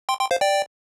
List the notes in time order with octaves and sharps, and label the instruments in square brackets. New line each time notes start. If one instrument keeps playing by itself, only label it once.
[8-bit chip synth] G5 C6
G5 C6
C5 F5
D5 G5